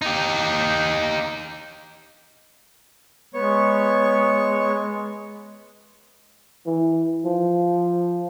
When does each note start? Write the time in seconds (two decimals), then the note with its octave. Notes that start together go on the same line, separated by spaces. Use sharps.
0.02 D#4 G4
3.34 G#3 B3 C#5 C#6
6.66 E3
7.25 F3